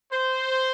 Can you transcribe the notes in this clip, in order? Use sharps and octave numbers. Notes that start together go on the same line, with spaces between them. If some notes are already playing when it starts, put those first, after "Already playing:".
C5